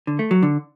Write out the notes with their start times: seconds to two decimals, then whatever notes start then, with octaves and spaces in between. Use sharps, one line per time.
0.07 D3
0.19 A3
0.31 F#3
0.43 D3